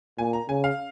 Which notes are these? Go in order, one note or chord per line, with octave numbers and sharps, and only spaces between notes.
A#2 G#5
A#5
C#3 G#5
F5